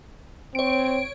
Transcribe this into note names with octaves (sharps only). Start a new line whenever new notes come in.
C4 C#5 D7